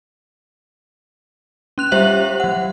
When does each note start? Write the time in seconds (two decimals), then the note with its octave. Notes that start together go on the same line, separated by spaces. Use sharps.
1.78 C#4 F#6 F7
1.92 G3 G4 C5 E5 F#7
2.40 F#3 F#5